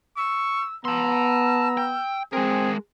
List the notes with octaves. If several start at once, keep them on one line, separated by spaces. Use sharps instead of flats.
C#6 E6
B3 A5 A#5 C6 E6
G5
G#3 C4 G#4 A#4